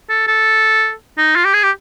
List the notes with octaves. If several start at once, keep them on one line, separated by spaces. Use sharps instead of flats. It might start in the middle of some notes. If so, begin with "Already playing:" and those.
A4
A4
D#4
F4
G4
G#4
G4